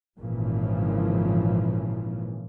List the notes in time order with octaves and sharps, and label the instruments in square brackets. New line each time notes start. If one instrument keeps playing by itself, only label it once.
[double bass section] G#1 A#2 C#3 E3 F3